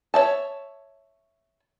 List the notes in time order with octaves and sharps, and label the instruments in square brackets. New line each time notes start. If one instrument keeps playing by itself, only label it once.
[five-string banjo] C#5 D5 E5 A5